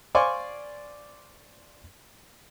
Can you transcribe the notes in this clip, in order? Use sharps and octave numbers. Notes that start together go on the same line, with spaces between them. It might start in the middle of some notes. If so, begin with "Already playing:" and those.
C5 D5 F5 G#5 C6 C#6